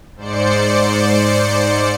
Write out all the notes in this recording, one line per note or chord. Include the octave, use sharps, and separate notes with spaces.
G#2 C5 D5 C#7